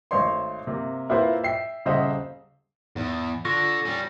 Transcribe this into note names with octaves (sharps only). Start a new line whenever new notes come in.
G#1 A3 C5 C#5 D#5 C6
C3 A#3
A#3 E4 F4 B4 C5
E5 G5 C7
D#1 C#3 C5 D#5 E5 F#5
E2 G#2
D3 F4 C#6 A#6
G3 C#4